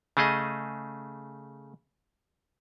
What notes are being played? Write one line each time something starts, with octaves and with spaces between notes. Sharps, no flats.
C#3 A3 G#4 D#5